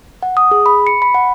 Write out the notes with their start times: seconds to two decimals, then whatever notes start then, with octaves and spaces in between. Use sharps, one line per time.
0.23 F#5
0.37 D#6
0.51 G#4
0.66 B5
0.87 C#7
1.02 B5
1.14 F#5